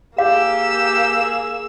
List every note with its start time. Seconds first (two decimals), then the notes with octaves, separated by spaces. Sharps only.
0.18 A#3 G4 G#4 F5 E6